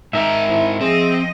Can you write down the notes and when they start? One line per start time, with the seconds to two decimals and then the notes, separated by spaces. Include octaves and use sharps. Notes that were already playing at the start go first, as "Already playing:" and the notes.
0.13 G#2 D#4 A#4 E5
0.49 E4 C5
0.81 F3 C4 G#4 D#5